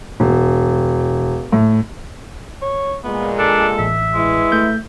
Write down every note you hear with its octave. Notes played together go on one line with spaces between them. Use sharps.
E1
A2
C#5
A#2 G#3 B3
D4 A4
A1 E5
G#3 E4 B4
A3 G6